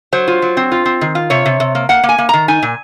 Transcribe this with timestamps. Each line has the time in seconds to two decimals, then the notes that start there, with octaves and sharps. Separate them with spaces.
0.13 F#3 C5
0.28 F4
0.42 F#3
0.57 C4
0.72 F4
0.86 C4
1.01 D#3
1.15 F4
1.30 C3 C#5
1.46 C3
1.60 C3
1.75 A#3
1.89 A#3 F#5
2.03 A#3
2.09 G#5
2.18 A#3
2.29 D#3 A#5
2.48 D#4 G#5
2.63 A#2